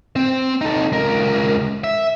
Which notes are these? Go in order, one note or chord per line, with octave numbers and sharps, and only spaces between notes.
C4 C5
D#4 A4
C#2 A#4
E5